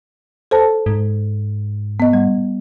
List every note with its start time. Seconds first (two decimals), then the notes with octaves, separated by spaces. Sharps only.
0.51 A4 C5 A5
0.86 G#2
2.00 B3 D#5
2.13 G3